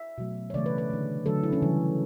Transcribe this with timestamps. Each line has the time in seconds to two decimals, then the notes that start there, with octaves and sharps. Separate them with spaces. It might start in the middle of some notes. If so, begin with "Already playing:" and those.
Already playing: E5
0.18 B2 F#3 A3
0.50 C#5
0.54 C#3 E3 A3 D5
0.66 B4
0.78 B4
0.90 D3 A3
1.26 D3 F#3 A3 A4
1.43 E4
1.53 C#4
1.62 C#3 E3 G3